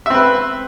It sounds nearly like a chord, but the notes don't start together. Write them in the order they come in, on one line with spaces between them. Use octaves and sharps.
E5 C4 B4